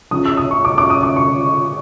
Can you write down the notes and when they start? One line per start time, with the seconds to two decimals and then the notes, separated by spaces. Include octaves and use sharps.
0.11 C#3 F3 D#6
0.25 E6
0.37 D#6
0.51 C#6
0.65 D6
0.78 D6
0.90 D#6
1.03 D6
1.16 C#6